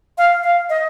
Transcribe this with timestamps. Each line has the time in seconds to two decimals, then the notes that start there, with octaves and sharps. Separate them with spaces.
0.18 F5
0.43 F5
0.70 D#5